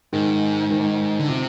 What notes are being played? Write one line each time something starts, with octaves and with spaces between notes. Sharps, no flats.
G#2 D#3
D#3
D3
C3 F3